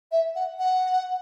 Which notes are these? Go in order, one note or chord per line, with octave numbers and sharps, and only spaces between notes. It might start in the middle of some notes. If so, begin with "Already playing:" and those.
E5
F#5
F#5